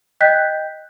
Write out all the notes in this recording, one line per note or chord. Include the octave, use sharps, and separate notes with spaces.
D#5 G5 F#6 G6 B6